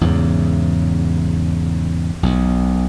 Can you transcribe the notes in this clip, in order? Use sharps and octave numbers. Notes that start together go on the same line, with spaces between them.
E2 G#2 C#3
B1